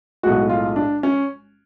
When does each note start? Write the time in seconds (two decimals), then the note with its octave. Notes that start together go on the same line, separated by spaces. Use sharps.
0.23 B1 A2 G#3 F#4
0.50 F4
0.76 D4
1.03 C#4